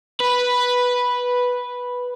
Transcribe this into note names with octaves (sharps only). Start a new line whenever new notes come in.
B4